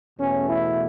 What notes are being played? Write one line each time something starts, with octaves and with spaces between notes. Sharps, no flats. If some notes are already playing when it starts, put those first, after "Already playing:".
E2 B2 A3 C#4
E4